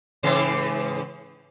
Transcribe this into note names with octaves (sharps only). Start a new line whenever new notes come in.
G#2 C#3 E3